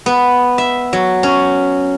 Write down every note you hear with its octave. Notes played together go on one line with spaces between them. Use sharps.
B3
E5
F#3
C#4